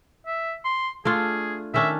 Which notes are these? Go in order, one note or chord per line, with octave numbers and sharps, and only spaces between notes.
E5
C6
A3 D4 F4 G#4
D#3 C#4 D4 E5